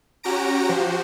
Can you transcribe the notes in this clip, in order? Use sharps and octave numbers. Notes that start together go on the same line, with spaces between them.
C#4 F#4 G4 A#5 A#6 D7
F3 F#4 G4 C5